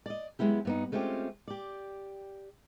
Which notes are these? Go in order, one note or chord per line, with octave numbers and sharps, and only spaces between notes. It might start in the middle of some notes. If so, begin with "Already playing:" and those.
D5 D#5
F#3 G#3 B3 E4 G4
G2 B3 D#4
G#3 A3 C4 C#4 F4 G4
G4 D5